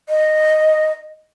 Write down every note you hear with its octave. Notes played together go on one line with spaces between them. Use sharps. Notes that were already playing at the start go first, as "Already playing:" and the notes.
D#5